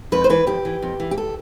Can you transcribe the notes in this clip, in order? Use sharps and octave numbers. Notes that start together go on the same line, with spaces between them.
F2 B4
C5
E3 B4
F2 G4
E3
F2
E3
G4
A4